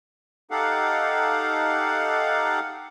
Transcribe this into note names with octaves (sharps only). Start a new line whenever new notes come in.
D#4 G4 A4 F5 F#5